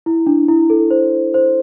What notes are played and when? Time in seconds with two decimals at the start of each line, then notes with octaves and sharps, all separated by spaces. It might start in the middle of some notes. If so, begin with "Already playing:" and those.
0.06 E4
0.26 D4
0.48 E4
0.70 A4
0.91 C5
1.34 C5